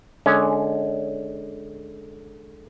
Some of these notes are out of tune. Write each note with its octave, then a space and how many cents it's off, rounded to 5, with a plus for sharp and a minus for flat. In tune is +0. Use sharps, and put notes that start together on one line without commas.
D3 +10 G#3 +25 C#4 +0